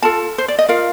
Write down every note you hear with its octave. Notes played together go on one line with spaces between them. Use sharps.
F4 A4 A5
C5
D5
D#5
F4 A#4 F5